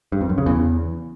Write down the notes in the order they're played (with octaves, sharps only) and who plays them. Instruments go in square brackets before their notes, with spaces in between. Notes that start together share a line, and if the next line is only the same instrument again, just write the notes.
[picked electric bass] G2
F2
F#2
C#3
E2